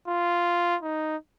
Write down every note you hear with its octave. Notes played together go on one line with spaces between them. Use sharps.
F4
D#4